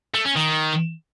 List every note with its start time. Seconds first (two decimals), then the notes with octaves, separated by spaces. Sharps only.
0.14 A3
0.25 C#4
0.36 D#3